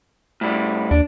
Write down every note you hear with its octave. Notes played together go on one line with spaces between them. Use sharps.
A2 G3
D#2 D4